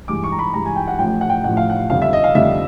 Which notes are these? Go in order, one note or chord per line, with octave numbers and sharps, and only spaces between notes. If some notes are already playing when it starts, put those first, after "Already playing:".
G2 E3 G#3 D6
C#6
A#5
B5
G2 E3 G#3 A#5
G#5
G5
F#5
A1 A2 F3 G5
F#5
G5
A1 A2 F3 F#5
F5
F#5
F2 D3 G3 F5
E5
D#5
F5
F2 D3 G3 E5